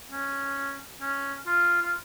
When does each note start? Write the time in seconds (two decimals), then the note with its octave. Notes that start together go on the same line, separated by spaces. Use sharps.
0.12 C#4
1.02 C#4
1.47 F4
1.82 F4